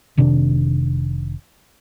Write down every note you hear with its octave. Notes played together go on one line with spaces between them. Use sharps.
F1 C3 D#3 D4